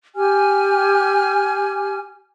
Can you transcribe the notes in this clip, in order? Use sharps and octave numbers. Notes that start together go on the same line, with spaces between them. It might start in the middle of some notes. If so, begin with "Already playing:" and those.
G4 G#5 F6